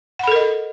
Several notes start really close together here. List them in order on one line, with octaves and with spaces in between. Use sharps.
F#5 B5 A4 A#4 D#5